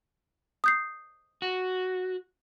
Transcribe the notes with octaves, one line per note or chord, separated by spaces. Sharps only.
D#6 G6 C7
F#4